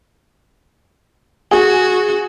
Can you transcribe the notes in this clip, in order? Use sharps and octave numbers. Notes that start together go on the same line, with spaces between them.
F#4 G#4